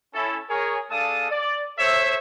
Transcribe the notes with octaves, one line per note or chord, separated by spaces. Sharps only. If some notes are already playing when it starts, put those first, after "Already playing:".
C#4 E4 A4
G#4 A#4 C#5
G#3 D4 A4 F5 A5 D#6
D5
A4 C5 C#5 E5